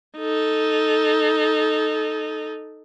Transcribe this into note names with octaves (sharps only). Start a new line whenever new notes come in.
D#4 A4